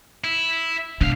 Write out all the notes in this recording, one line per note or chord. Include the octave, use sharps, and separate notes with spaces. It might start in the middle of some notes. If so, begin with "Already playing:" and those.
E4
E1 C2 D4 F5